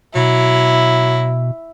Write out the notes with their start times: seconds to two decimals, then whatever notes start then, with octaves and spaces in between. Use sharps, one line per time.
0.15 B2 F#3 E4